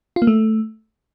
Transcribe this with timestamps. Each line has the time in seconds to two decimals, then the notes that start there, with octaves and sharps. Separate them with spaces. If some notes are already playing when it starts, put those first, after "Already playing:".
0.16 F4
0.22 A#3
0.27 A3